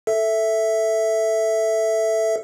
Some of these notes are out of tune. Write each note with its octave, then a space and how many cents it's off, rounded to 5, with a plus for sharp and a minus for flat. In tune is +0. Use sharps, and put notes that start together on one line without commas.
A4 +0 E5 +0